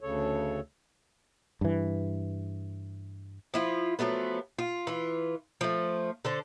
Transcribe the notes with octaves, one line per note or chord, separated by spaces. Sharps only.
D2 C#3 A4 C#5
G2 E3
F3 E4 F4
F3 F#3 A3 B3
F4
E3 F4
F3 A3
D3 A4 C5